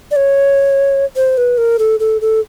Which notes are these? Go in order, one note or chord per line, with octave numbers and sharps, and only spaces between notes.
D5
C#5
C5
B4
A#4
A4
A4
A4